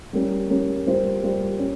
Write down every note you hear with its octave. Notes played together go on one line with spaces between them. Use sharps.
G3 A#3 C#4
G3 A#3 C#4
G3 A#3 F4 C5
G3 A#3 F4 C5
C#4